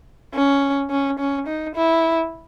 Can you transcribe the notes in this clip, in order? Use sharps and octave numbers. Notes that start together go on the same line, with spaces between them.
C#4
C#4
C#4
D#4
E4